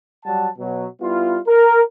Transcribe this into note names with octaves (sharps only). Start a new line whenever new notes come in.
F#3 G3 F#5 A5
B2 F#3
G3 B3 E4 F4
A#4